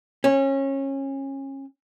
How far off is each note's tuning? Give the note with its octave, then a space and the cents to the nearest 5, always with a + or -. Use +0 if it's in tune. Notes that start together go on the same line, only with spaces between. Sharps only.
C#4 -25